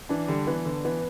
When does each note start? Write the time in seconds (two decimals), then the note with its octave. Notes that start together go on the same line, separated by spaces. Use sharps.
0.09 E3 D4
0.28 D3 G3
0.47 E3 B3
0.65 D3
0.85 E3 B3